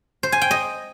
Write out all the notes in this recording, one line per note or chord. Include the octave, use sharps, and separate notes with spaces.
C5
G#5
G5
D#5